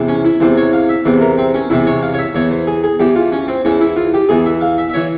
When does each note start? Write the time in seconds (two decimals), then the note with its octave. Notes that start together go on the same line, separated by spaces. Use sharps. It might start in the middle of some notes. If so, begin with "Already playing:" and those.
Already playing: E2 C3 E3
0.08 C#4
0.25 E4
0.40 E2 C3 E3 C5
0.57 C#5
0.73 F5
0.89 E5
1.06 E2 C3 E3
1.21 A#4
1.38 C4
1.54 C#4
1.70 E2 C3 E3 E4
1.87 C#5
2.03 F5
2.14 C#5
2.19 E5
2.35 E2 E3 C#5
2.51 C5
2.67 G#4
2.84 G#4
3.00 E2 E3 G4
3.16 F4
3.32 C#4
3.48 C4
3.65 E2 E3 C#4
3.81 E4
3.97 F4
4.14 G4
4.29 E2 E3 G#4
4.46 E5
4.61 F5
4.78 E5
4.90 E5
4.94 E3 C#5